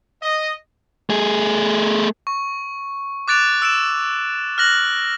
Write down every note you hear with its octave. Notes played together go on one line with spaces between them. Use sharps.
D#5
A3 G#4
C#6
D6 F#6 A6 D7 F7
E6 D7 E7
F6 F#6 A#6 F#7